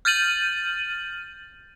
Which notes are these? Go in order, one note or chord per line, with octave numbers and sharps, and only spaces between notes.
F6 G6 A6 D#7 F#7